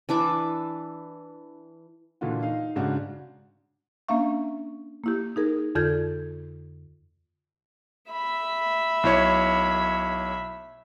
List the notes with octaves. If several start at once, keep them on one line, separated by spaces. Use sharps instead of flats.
E3 D4 E5 D6
A#2 D3 E3 F4 F#4
D#4 F5
G#2 C#3 D4 F#4
A#3 C#4 D4 E5 F5 C#6
A#3 E4 G4
D#4 G#4 A#4
F2 D3 F4 A4 G6 G#6
E5 B5
B1 E4 C#5